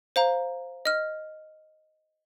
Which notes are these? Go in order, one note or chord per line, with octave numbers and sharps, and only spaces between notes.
C5 F5 A#5
D#5 F6